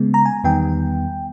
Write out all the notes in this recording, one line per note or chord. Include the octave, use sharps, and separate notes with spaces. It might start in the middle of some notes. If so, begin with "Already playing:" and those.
Already playing: C#3 G#3 B3
A#5
G#5
E2 D#3 G3 B3 G5